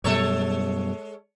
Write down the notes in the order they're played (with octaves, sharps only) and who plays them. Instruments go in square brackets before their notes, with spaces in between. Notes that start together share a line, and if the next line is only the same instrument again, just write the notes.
[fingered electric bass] F#2 B2 G3 [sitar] G#3 A4 C#5